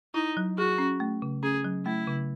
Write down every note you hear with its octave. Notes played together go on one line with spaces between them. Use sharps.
D#4 E4
F#3
F#4 G#4
C#4
A3
C#3
C#4 G#4
F#3
A3 E4
C#3